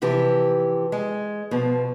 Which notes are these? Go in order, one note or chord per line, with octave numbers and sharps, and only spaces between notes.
C3 E3 F3 G4
G#3
B2 F3